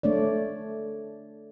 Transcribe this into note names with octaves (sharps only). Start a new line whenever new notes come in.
A3 D4 C#5 D5